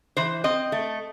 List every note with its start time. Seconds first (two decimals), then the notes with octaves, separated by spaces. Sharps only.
0.17 E3 C5
0.44 C4 D#5
0.72 A3